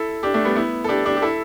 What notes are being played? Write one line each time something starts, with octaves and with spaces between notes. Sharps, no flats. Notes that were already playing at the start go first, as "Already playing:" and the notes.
Already playing: E4 A4
D4 G4
A3 D4
G3 B3
B3 E4
A4
D4 G4
D4 G4
G4
E4 A4